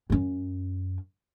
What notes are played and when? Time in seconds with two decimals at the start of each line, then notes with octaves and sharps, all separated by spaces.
0.10 F#2 C#4